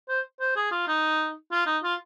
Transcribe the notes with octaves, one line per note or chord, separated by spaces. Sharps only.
C5
C5
G#4
F4
D#4
F4
D#4
F4